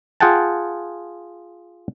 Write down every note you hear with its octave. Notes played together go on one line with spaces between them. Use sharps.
F4 G#4 F#5 G5 A5